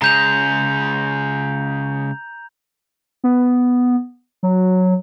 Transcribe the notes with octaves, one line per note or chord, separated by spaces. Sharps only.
C#3 G#3 A#5 G6 F7
B3
F#3